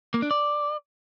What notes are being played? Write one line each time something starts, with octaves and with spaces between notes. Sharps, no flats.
A#3
D4
D5